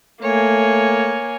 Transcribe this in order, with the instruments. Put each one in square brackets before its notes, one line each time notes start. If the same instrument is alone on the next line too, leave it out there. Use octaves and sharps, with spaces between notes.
[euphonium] A3 [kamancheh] A#3 G#5 [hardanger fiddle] C#5